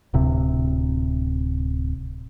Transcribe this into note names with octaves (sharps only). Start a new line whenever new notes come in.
D1 C3